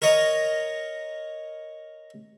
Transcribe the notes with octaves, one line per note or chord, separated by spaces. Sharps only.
A#4 C#5 D#5 A#5